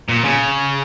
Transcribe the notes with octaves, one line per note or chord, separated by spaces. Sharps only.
A#2
C#3